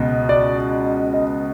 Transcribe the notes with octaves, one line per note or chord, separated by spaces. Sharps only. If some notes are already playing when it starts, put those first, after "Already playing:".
Already playing: C#2 B2
D5
D#5